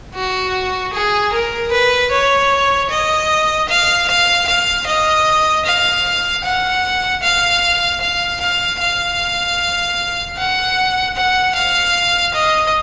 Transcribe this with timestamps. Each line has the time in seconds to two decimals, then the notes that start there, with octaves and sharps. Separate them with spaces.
0.15 F#4
0.94 G#4
1.33 A#4
1.72 B4
2.12 C#5
2.90 D#5
3.69 F5
4.08 F5
4.47 F5
4.87 D#5
5.66 F5
6.44 F#5
7.23 F5
8.01 F5
8.41 F5
8.80 F5
10.38 F#5
11.16 F#5
11.55 F5
12.34 D#5